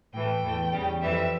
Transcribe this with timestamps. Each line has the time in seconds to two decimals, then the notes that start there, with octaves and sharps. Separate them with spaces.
0.14 A2 E3 A3 G5
0.43 E2 E3 A3
0.73 E2 C#3 G3
1.02 F2 E3 G3 E5